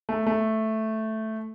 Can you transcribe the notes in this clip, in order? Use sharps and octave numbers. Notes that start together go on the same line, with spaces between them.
A3
A3